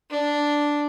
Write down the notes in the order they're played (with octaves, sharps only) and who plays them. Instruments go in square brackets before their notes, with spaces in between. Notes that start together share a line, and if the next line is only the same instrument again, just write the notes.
[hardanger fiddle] D4